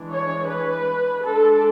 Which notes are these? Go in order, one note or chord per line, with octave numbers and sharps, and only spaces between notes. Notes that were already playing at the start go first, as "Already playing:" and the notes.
Already playing: E3 G#3 D4
C#5
B4
G#3 D4 A4